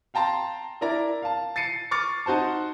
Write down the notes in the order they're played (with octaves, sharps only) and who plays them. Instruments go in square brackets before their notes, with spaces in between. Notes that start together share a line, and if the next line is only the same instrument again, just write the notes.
[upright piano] F5 G5 A5 A#5 C6
D4 E4 A#4 D5 A#5
F5 A5
A6 C7 C#7 D#7
C#6 D6 F6 A6 C#7
D#4 F#4 C5 A5